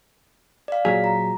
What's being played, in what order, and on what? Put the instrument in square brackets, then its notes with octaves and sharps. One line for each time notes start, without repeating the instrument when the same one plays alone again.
[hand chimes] D5 F5
[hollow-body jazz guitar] A#2 F#3 G#4 [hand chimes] B6
[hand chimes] A#5